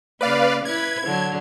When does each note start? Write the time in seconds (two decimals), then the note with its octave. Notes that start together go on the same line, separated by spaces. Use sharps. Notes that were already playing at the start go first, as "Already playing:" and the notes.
0.21 C#3 A#3 B4 D5 F5
0.65 E4 B4 G#6
1.06 D3 F#3 D4